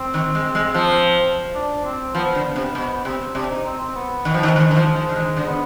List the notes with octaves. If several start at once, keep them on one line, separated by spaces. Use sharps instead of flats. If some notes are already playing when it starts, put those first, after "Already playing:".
Already playing: C4
D#3
G#3
G#3
F3
D4
C4
F3 B3
D3
B3
C3
B2 B3
C3 C4
C3 D4
D#4
C4
C4
B3
D#3
F3
D#3
D#3 G#3
D#3
F3
F3
D3
D#3 G#3
D3
B3